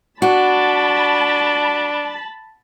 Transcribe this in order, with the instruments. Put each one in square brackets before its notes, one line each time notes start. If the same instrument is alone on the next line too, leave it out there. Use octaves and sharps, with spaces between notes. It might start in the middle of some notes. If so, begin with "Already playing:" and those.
[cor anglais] D4 [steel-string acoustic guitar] F#4 [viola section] A5 B5